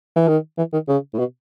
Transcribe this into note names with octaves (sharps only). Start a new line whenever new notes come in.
E3
D#3
E3
D#3
C#3
A2
B2